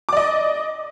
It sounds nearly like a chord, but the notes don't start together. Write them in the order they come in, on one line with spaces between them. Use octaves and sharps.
D6 D5 D#5